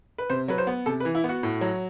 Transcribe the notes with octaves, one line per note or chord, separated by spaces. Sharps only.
B4
C3 C5
F#3 B4
C5
B3
C3 A4
B4
E3
E4
B3 F#4
A2
F#3